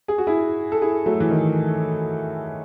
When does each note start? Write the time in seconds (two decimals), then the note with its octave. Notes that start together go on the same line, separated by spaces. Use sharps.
0.08 G#4
0.18 F#4
0.27 E4 G#4
0.72 A4
0.82 E4 G#4
1.06 F#3 A3
1.20 E3
1.30 D#3